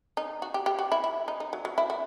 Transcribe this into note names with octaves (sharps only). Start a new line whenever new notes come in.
D#4
F#4
G4
G4
F#4
E4
E4
D#4
D#4
F#3
F#3
E4
F#4